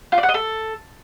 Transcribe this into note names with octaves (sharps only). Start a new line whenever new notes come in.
F4
D5
F#5
D#5
A4